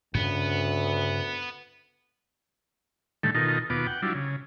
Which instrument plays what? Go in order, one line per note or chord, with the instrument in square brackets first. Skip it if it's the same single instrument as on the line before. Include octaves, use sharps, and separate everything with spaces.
[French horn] D2 [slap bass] G2 C#3 [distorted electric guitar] B3
[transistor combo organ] A2 D3 D#3 G3 A3
B2 D#3 D#4 F4 A4 A#4
D#2 B2 B3 F4 D6
F#5 G5
F#3 G3 D4 E4 F4
C#3